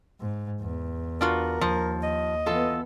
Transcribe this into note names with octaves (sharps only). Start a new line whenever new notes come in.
G#2
E2
D4 F4 F#4 A#4
D#2 F3
D#5
E3 B3 F4 A4